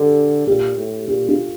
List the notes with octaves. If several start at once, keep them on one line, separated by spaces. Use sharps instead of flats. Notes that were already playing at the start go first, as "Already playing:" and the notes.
Already playing: D3 G4 A4
A#2 G4
A2
A#2 G4
F4